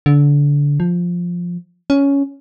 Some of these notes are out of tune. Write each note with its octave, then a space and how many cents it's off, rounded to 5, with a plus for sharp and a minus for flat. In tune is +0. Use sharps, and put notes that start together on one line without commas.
D3 -25
F3 +5
C#4 +10